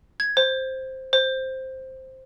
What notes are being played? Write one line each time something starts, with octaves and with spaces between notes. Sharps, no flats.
G#6
C5
C5